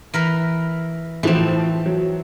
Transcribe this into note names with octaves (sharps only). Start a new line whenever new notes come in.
E3 A#4 B5
A2 E3 F3 C4 E7
F#3